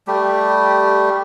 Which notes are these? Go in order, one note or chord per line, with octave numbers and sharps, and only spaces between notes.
G3 A3 G4